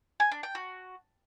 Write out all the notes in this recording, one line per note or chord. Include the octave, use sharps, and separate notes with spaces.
G#5
D4
G5
F#4